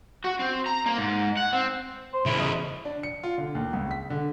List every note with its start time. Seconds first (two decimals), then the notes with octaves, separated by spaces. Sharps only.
0.24 F#4
0.39 C4
0.66 A#5
0.86 A#3
0.98 G#2
1.37 F#5
1.53 C4
2.13 C5
2.26 E2 C#3 E4
2.40 D#5
2.85 D4
3.03 C#7
3.23 F4
3.38 D3
3.55 D#2
3.73 C#2
3.91 B6
4.10 D3